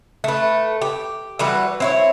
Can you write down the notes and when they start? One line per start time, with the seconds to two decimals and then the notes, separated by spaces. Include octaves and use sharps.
0.24 A3 B4
0.82 G4
1.39 E3 G3 F#4 B4
1.80 C4 E4 C#5